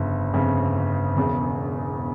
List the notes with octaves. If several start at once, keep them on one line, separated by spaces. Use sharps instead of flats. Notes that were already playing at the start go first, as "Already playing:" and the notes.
Already playing: G1 F2 C#3
G1 F2 C#3
E1 E2 C#3